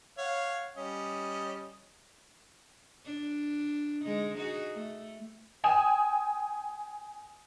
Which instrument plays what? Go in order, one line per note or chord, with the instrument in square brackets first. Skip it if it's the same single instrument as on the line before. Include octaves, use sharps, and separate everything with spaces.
[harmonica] C#5 F5 F#5
G3 C#4 D#5
[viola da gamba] D4
D3 G#3 D#4
D#4 F#4 G#4
A3
[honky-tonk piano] G5 G#5 D#6 E7